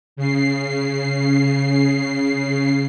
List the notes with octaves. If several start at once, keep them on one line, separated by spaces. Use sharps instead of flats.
C#3 C7